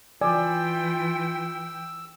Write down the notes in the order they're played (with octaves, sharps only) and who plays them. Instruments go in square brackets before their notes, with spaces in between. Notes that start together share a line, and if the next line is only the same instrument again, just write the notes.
[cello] E3 G5 [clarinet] F4 [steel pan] D5 G#5 [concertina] E6